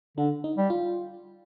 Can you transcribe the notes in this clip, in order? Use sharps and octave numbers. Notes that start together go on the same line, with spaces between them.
D3 D4
D#4
G3
F4